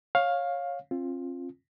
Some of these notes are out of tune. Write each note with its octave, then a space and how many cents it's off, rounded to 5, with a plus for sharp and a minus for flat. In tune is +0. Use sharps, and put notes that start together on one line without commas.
C#5 -10 F5 +15
C4 +40 F4 +0